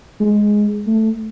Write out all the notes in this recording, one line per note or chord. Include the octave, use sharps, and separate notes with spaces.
G#3
A3